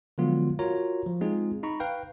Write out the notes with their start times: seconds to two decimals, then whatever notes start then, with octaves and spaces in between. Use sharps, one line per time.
0.18 D3 F3 F#3 G#3 B3 F4
0.59 F4 F#4 A#4 C#5 A#5
1.06 F3
1.21 G#3 C4 D#4 F4 G#4
1.63 D#4 A#5 B5 C#6
1.80 B4 F5 G5